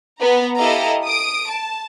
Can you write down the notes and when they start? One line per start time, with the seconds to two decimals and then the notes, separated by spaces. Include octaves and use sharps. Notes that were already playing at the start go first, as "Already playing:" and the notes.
0.19 B3 A#5
0.56 E4 G4 A4 D#5 F5 A#5
1.04 D#6 D7
1.48 A5